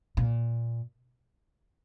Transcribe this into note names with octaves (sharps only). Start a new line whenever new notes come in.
A#2